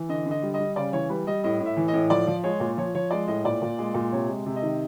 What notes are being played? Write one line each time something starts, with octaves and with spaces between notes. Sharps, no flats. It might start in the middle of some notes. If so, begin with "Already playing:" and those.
Already playing: E3
D3 D#5
D3
D#5
G3
G3 D#5
C#3 D5
E3 C#5
G3 B4
G3 D#5
A2 D#5
A2
E5
E3
D#5
A2
F3 D5
F3
G#3 C#5
A#2
F3 C#5
F3 C#5
G#3 D5
A2 D#5
A#2 D5
A#2
G#3
A#2
C3 C#5
G#3
C3
D#5
D#3